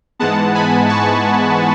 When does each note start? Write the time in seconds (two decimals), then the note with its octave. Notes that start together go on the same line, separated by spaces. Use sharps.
0.19 G#2 E3 G#3 B3 F#5 A5
0.55 G#5 B5
0.89 A5 C#6